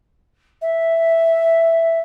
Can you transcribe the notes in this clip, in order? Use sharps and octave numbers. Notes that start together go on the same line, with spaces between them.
E5